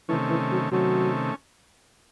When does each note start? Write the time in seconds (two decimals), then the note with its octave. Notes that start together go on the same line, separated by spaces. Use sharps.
0.09 C3 D#3 E3 A3 C#4
0.30 E3
0.52 F#3
0.72 C3 D#3 F#3 A3 C#4